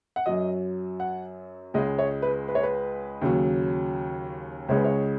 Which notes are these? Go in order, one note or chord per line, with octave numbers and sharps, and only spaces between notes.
F#5
F#2 F#3 D#5
F#5
C#2 C#3 G#3 D#5
C#5
B4
B4
C#5
B4
D#2 C#3 F#3
C#2 C#3 G#3 C#5
B4
C#5